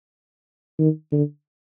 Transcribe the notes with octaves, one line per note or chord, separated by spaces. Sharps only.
D#3
D3